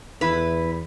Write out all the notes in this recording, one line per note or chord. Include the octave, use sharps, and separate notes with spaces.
E2 E4 B4